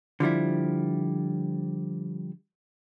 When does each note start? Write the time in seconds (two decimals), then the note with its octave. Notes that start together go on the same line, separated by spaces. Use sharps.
0.20 D3 F3 G3 E4